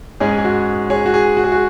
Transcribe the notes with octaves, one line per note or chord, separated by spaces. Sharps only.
G#2 G#3 C#4 G#4
G#4
F#4
G#4 C#5
F#4
G#4
F#4
G#4
F#4